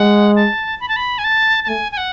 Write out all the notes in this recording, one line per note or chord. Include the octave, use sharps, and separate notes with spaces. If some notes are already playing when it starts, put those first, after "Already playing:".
Already playing: G#3 F#5
A5
B5
A5
B5
G#5
A5
A5
A3 G#5
G#5
F#5